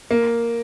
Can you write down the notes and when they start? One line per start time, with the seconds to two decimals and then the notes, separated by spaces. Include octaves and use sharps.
0.11 A#3